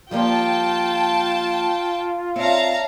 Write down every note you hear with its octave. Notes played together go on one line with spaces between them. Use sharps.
F3 G3 A#3 F4 G5 A5
C4 C#5 D5 E5 F5 A5 A#5